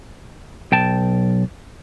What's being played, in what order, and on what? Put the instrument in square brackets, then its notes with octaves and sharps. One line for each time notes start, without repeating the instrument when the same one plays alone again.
[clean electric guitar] B1 G5 A5